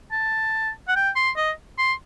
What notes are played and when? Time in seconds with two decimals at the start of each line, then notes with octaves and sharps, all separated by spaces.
0.12 A5
0.88 F#5
0.96 G5
1.16 C6
1.37 D#5
1.79 C6